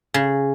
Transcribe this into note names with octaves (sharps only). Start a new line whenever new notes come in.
C#3